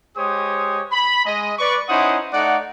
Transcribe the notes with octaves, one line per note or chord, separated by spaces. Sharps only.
G#3 G4 C5 C#5 D#6
B5
G#3 D#5
B4 D5 C#6
C#4 D#4 E4 C5 F#5 D#6
A3 D#4 D5 F#5